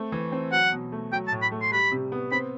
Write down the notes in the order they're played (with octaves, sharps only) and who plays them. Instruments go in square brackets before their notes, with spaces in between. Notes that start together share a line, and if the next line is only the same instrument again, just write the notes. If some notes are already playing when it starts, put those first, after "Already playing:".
Already playing: [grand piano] A3 C4
E3
C4
[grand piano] F#3 [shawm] F#5
[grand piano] B2
A3
[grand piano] F#3 [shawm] G5
[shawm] A5
[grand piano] A2
[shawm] B5
[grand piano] A3
[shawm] C6
[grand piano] G3 [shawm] B5
[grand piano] C3
B3
[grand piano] C4 [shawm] B5